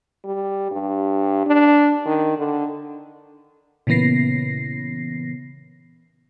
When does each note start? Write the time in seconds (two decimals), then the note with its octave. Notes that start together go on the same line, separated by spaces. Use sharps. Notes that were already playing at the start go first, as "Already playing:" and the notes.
0.25 G3
0.71 G2
1.47 D4
2.06 D#3
2.37 D3
3.87 A#2 C#3 E3 B3 A#6 C7